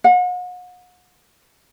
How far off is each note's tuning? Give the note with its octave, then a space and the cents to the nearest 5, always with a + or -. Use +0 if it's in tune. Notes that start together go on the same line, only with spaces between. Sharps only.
F#5 -40